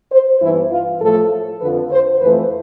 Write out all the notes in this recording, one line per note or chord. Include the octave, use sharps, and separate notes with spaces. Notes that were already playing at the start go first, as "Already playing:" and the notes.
C5
G2 E3 B3 E4
F4
A2 F3 A3 A4
F2 D3 F3 B4
C5
F2 E3 A3 B4